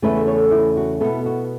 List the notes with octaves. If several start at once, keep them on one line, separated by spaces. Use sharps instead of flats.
E2 C#3 A3 C#4 B4 E5
A4 C#5
E4
F#4
B2 B3 E4 A4
F#4